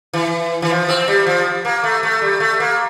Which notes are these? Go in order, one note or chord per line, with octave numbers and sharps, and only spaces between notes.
E3
E3
F3
C4
G3
F3
A#3
A3
A3
G3
A3
A#3